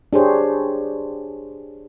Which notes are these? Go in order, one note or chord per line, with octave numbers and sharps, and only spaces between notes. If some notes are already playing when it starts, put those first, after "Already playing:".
D4 G4 G#4 C5 C#5